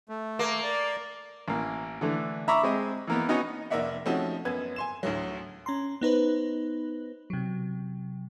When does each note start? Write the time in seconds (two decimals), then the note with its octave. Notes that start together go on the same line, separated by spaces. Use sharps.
0.09 A3
0.39 A#3
0.63 D5
1.48 A1 A#3
2.01 D3 E3 A3
2.48 E5 A#5 B5 C#6 D6 E6
2.63 G#3 C4 D#5
3.07 E3 A#3 B3
3.29 B3 C#4 D#4 F#4 C#5 D#5
3.70 F1 A#3 A#4 D5 E5 F#5
4.06 F3 A3 C4 C#4 D#4 F#4
4.45 F#2 B3 B4 G#6
4.76 G#5 C6 E7
5.03 D2 A2 F#3
5.66 C#4 A#5 C6
6.01 B3 D#4 B4 C5
7.30 C3 F#3